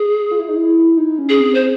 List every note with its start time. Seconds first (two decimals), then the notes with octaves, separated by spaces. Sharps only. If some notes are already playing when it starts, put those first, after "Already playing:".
Already playing: G#4
0.31 F4
0.39 E4
0.48 D#4
0.56 E4
0.97 D#4
1.19 C#4
1.29 G#4
1.40 C4
1.55 C5